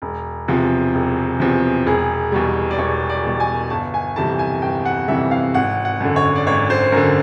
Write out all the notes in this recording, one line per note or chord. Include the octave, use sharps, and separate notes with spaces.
E1
E2 C3 F3
E1
E2 C3 F3
E1 G#4
E2 B2 G3
D5
E1 C#5
D5
E2 B2 G3
G#5
G1 A5
G#5
F2 C3 E3 G3 A5
G#5
G1 G5
F#5
F2 C3 E3 G3 E5
F5
G#1 F#5
F#5
F#2 D3
C#5
D5
G#1 C#5
C5
F#2 D3 A#4